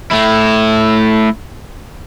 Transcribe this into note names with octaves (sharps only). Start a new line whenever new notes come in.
A3 E4